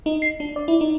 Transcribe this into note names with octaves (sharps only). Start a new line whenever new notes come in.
D#4
C7
D4
D5
E4
D#4